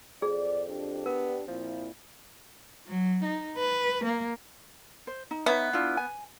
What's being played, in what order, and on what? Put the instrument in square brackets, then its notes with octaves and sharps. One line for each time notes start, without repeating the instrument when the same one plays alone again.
[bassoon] F2 [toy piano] G#4 [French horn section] D5
[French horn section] D4 G4
[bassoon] B3 [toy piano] A#4
[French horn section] A#2 C4 E4 [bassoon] F3
[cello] F#3
D#4
B4
A#3
[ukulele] C5
D#4
[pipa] B3 [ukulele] D#4 C#5 E5
[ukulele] D4 E4 F4
G#5